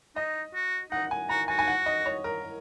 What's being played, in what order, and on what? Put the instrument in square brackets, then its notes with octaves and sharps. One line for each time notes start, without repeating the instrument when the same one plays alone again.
[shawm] D#4 [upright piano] D#5
[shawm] F#4
[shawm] D#4 [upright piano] F#5
[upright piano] G#5
[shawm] F#4 [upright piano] A#5
[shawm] F#4 [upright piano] G#5
[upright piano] G#5
F#5
D#5
C#5
A#4